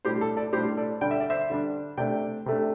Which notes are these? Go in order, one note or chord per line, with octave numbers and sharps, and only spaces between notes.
A2 G3 D4 G4 C5
A4
A4 D5
A2 G3 D4 G4 C5
A4 D5
D3 G3 D4 G5
E5
D5
C5 E5
D3 G3 D4
C3 A3 D4 D5 G5
C3 A3 D4